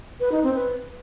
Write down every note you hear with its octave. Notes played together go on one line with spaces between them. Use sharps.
B4
D#4
C4
B4